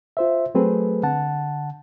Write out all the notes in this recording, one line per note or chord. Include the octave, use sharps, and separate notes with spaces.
F4 C5 E5
F#3 A3 C4 G#4 A4 B4
D3 F#5 A5